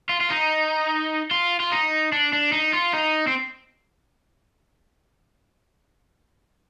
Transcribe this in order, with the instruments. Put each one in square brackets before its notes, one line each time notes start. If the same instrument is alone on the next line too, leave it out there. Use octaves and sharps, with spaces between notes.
[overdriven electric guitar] F4
F4
D#4
F4
F4
D#4
D4
D4
D#4
F4
D#4
C4